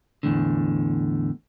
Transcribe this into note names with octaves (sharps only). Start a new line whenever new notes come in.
E2 A2 D3